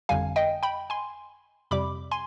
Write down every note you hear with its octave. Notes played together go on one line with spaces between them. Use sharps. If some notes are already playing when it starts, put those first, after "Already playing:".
G1 F2 D3 G3 F5 G#5
D#5 G5
G5 B5
G#5 C6
F2 C3 G3 B5 D6
G#5 C6